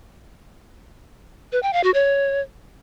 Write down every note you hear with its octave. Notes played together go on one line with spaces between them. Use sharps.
B4
G5
F5
F#4
C#5